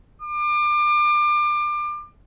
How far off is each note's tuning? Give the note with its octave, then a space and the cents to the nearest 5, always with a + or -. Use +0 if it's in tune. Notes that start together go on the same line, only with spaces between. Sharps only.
D6 +30